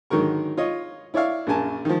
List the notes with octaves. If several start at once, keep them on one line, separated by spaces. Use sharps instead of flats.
G#2 D3 D#3 F#3 A#4 C#6
F4 C#5 D#5
E4 C#5 D5 E5 F5
A#1 F#2 A#4 G#5 A5
D#3 F3